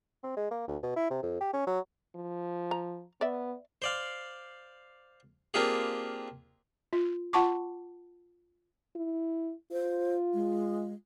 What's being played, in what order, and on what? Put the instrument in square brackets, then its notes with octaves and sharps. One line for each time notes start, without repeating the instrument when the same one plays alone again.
[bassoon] C4
G#3
A#3
D2
B2
E4
C3
F2
G4
C#4
F#3
[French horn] F3
[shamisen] A#5
[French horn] B3 [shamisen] D5 E5
[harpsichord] C5 D5 F5
A#3 C4 D4 F4 G4 G#4
[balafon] F4
F4 F#5 A5 C#6 D6
[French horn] E4
[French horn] F4 [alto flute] C5
[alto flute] G#3